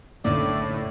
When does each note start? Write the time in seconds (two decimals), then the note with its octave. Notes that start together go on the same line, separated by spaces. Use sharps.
0.25 B1 F#2 A2 D3 A#3 D5